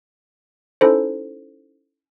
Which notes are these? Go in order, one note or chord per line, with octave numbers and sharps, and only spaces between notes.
C#4 D#4 E4 A4 C5